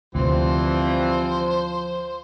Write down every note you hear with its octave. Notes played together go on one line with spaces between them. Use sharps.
D2 C3 E3 F3 G3 C4 C5